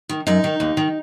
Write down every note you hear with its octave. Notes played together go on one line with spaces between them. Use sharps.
D#3
F#2 D#4
D#3
D#2
D#3